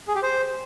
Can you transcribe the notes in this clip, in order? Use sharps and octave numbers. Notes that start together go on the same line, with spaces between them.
G#4
G4
C5